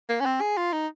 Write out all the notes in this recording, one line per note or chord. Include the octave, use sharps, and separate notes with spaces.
A#3
C#4
C4
G#4
F4
D#4